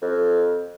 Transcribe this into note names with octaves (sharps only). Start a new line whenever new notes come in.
F2